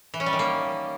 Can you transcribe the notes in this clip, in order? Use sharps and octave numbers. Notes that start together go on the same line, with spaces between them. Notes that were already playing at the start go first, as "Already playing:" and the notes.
E3
C#4
G3
D#3
A#3